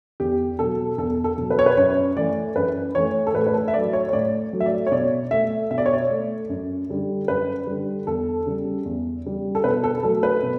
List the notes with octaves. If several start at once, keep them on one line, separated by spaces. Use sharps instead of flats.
E2 G4
B2 F#3 A4
E2 A4
A4
B2 F#3
B4
C#5
B4
F#2 C#5
E3 A3 D5
F#2 B4
E3 A3 C#5
A4
A2 B4
B4
A4
E5
F#3 A3 D5
C#5
C#5
A2 D5
F#3 A3
E5
D5
C#5
B2 D5
A3 E5
B2 E5
D5
C#5
D5
A3
F#2
D3 G3
F#2 B4
D3 G3
E2 A4
C#3 G3
E2
C#3 G3
A4
B2 B4
A4
F#3 A3 A4
B4
B2